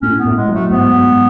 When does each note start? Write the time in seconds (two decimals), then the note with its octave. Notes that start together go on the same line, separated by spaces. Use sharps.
0.02 A2 C#4
0.20 B3
0.26 A2
0.37 G#3
0.49 F#3
0.54 A3
0.71 G#2 B3
0.95 G#2